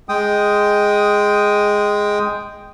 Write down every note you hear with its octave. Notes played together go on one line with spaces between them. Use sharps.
G#3 G5 D#6